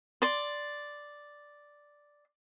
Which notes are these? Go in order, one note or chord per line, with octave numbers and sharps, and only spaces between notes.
D5 C6